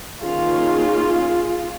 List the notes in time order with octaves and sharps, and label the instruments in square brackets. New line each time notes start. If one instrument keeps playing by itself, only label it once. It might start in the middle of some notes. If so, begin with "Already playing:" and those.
[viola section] D#3 A#3 C#4 F4 G#4